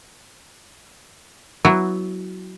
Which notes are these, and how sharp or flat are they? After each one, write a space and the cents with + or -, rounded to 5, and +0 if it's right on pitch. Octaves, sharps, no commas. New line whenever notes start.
F#3 +10 B3 +0 E4 +0